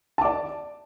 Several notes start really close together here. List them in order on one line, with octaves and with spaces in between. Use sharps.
A5 D6 D5